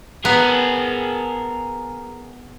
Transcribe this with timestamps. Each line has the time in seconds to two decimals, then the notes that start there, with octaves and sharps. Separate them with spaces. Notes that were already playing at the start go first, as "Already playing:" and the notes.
0.25 B3 G#4 A#4